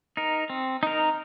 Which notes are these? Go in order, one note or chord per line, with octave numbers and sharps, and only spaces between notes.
D#4 A#4
C4
D#4 A#4